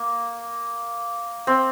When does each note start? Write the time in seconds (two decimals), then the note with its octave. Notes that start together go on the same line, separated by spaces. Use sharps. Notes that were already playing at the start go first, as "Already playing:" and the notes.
Already playing: A#3
1.47 C4